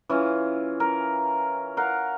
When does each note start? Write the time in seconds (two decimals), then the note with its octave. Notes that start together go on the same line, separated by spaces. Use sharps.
0.09 E3 C#4 F4
0.80 A#4
1.77 A#4 F5 F#5